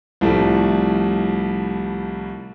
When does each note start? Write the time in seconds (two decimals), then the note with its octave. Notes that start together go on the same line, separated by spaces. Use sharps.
0.21 C2 A2 F3 G3 A3